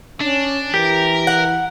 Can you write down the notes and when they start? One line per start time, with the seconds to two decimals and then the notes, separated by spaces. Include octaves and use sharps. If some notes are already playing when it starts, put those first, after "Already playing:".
0.21 C#4 D4
0.74 E3 G4 A#4
1.27 F#5